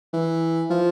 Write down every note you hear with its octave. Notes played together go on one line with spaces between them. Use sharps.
E3
F3